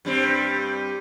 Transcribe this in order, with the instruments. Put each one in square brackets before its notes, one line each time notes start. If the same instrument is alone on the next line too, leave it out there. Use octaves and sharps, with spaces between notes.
[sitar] G2 G3 C4